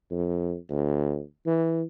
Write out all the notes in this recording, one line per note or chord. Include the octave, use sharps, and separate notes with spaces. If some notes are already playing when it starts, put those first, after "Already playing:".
F2
D2
E3